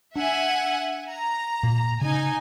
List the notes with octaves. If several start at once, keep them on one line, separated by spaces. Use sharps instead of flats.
D4 E5 F#5 G#5
A#5
A#2
C#3 D#4 G#5